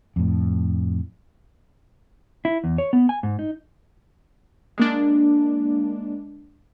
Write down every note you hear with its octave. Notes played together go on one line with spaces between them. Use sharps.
F2 A2
E4
E2
C#5
B3
G#5
G#2
D#4
G#3 A#3 D4